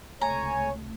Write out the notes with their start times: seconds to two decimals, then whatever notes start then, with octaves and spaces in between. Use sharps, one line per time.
0.21 C#2 C3 A3 C#5 G#5 A#5